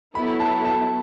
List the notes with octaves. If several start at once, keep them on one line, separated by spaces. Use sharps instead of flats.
F#3 B3 E4 A4 B5
A5
A5